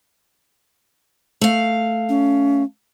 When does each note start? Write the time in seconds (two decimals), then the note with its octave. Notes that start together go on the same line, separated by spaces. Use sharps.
1.41 A3 F5
2.09 C#4